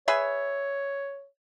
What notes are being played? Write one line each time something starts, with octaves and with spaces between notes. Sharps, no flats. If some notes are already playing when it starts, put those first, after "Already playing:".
G#4 B4 C#5 E5